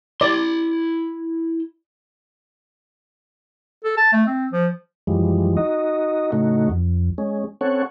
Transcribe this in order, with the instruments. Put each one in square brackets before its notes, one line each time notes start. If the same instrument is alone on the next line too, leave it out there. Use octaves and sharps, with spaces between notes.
[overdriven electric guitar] E4 C6 [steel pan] D5
[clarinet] A4
A5
A3
C4
F3
[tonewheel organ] F#2 E3 F3 G3 G#3
D#4 F#4 D#5
A2 C#3 A3 D#4 F#4
F2
G#3 C#4
C4 C#4 A4 C#5 F#5